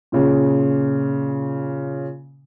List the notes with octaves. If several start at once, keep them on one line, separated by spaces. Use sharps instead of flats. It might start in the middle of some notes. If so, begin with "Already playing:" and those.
A#2 C#3